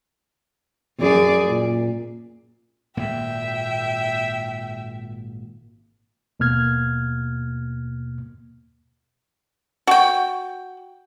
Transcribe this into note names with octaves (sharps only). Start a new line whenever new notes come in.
F#2 G#4 D5
A#2
G#1 A#2 A#3 E5 G5
D#2 B2 A#3 F6 G#6
F#4 G5